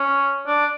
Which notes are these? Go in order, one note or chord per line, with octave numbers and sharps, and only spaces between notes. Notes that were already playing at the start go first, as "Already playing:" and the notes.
Already playing: C#4
D4